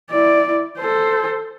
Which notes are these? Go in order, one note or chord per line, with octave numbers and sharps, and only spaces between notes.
E4 D5
A4 C5